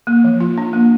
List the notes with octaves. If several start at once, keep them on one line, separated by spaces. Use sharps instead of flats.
A#3
F3
F4
D4
A#3